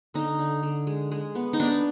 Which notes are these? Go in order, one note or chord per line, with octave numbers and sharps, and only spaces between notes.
D3 D#4
D3
D3
G#3
G#3
B3
D#4
B3 D4